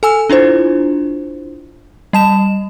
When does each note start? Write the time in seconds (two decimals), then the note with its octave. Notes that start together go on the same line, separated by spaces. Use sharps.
0.03 A4 G#5 E6
0.30 D4 E4 F4 C5
2.13 G3 A5 E7